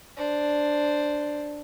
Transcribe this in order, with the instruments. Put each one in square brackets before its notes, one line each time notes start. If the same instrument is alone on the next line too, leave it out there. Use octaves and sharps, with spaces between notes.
[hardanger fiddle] D4 C5